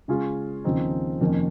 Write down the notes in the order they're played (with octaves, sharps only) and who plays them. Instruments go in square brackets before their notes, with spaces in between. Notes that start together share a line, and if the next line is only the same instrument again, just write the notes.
[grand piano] C#3 G#3 C#4 F4 G#4
D#2 C#3 F3 C4 D#4
F2 C3 D#3 A#3 C#4